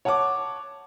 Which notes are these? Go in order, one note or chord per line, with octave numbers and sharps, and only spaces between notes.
C#5 F#5 A5 C#6 D6